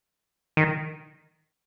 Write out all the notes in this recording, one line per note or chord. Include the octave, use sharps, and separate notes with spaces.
D#3